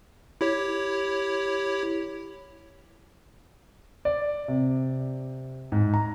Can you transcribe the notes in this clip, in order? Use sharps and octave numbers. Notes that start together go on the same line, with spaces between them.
E4 G4 C#5
D5
C3
G#2
A#5